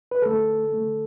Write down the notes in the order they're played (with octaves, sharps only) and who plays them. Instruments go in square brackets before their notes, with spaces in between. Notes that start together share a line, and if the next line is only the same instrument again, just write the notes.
[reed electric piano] B4
D3 A3 A4
D3 A3